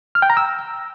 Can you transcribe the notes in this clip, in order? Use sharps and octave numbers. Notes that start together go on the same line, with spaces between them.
F6
G5
A#5
E6